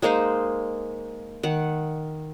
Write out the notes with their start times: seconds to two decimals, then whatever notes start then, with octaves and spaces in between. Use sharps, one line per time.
0.02 G#3 A#3 D#4 C5
1.43 D#3 F#5